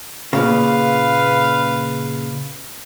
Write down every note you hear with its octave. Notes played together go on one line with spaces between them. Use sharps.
A#2 C#3 B4 F5